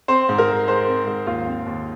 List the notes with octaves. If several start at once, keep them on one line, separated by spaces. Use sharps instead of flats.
C4 C5
G#2
A#4
G#3
G#3 C5
C4
G#2
D#2 F4 F5
C4
D#2